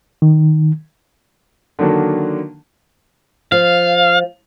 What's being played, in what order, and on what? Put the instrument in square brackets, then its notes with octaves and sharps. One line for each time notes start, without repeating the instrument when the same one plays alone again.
[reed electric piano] D#3
[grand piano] D3 D#3 F#3 A#3 D4
[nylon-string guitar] F3 [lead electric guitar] F5